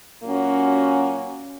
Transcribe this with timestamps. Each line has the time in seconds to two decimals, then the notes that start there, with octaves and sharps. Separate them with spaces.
0.23 A#2 F#3 A#3 C#4 F#4